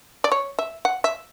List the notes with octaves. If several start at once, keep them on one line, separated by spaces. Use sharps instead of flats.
D5
C#5
E5
F#5
E5